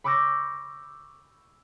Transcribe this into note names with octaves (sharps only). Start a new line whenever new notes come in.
B5 C#6 D6 E6 G6 A#6